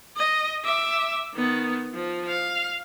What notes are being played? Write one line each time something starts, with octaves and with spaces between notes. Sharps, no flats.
D#5
E5 D6
D#3 B3
F3
F5